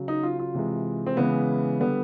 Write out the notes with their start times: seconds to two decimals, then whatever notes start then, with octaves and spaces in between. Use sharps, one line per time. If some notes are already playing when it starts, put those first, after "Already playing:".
Already playing: C#3 F#3
0.08 D#4
0.23 F4
0.39 F4
0.54 C3 E3 G#3
1.07 C4
1.17 C#3 E3 G#3 B3
1.80 D3 G3 B3